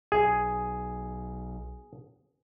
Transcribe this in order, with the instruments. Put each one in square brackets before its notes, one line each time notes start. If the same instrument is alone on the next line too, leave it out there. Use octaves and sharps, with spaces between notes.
[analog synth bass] B1 [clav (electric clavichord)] G#4